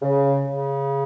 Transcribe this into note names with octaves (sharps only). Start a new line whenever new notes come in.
C#3
C#3